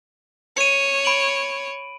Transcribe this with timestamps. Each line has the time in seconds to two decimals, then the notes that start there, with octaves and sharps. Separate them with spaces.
0.57 C#5 C#7 D#7
1.05 B5 D7 F#7